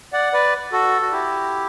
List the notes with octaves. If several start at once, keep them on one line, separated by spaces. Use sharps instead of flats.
D5 F#5
B4 D5
F#4 A4
F#4
E4 G4